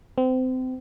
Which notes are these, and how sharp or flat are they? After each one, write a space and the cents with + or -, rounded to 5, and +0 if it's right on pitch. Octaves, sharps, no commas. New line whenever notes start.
C4 -30